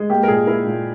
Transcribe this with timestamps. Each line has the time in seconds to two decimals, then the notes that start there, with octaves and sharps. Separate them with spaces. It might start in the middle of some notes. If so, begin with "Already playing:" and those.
Already playing: G#3
0.10 A#3 G4
0.23 A#4
0.28 A#2 G#4
0.47 E4 A#4
0.66 A#2